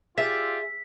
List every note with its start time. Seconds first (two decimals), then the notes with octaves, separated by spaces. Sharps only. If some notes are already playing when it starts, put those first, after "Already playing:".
0.18 F4 G4 G#4 D5 E5 B6